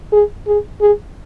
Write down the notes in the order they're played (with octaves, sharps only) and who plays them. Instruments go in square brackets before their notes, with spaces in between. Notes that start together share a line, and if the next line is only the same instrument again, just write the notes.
[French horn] G#4
G#4
G#4